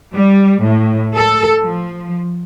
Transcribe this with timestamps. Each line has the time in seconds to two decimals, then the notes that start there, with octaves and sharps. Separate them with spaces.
0.13 G3
0.63 A2
1.15 A4
1.61 F3